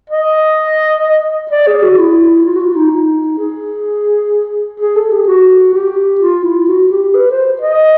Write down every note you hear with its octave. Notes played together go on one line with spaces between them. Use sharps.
D#5
D5
G#4
F#4
E4
F4
F#4
F4
D#4
D#4
G#4
G#4
A4
G4
F#4
G4
F4
E4
F#4
G4
B4
C5
D#5